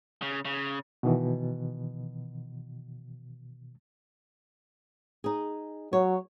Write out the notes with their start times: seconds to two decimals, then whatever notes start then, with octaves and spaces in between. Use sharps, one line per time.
0.22 C#3
0.45 C#3
1.03 B2 D#3 E3
5.24 D#4 G#4
5.93 F#3 C#5